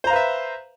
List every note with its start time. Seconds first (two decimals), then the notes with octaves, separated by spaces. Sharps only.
0.04 C5
0.07 A#5
0.10 F5
0.13 B4
0.16 E5